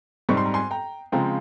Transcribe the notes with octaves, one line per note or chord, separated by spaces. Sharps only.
G#2 G3 C4 C#6
C6
A#5
G#5 C6
G5 A#5
C#3 F3 G#3 C4 F4 G5 A#5